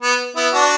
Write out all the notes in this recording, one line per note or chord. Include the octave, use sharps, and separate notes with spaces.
B3
B3 E4
D4 F#4